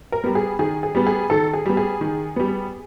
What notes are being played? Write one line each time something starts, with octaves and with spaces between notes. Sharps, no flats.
A#4
G3 B3
G#4
D#3 G#4
G#4
G3 B3
G#4
D#3 A4
G#4
G3 B3
G#4
D#3
G3 B3